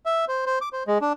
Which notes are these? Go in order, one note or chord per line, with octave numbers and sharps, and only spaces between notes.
E5
C5
C5
D6
C5
G#3
D4